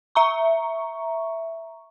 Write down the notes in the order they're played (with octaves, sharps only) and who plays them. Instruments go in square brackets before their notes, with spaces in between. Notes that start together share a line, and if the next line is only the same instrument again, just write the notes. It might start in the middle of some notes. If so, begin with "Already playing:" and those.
[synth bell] E5 A#5 C#6